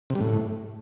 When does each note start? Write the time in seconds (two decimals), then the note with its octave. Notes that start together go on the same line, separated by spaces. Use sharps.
0.10 C3
0.15 G3
0.20 A2